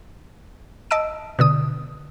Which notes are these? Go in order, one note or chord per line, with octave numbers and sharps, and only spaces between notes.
D#5 A5 E6 D7
B2 D3 D#6